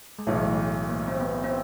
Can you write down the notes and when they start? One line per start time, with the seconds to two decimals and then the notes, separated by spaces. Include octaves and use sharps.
0.19 G#3
0.27 B1 A2 E3 A3
0.89 A#3
1.08 C4
1.20 B3
1.44 C4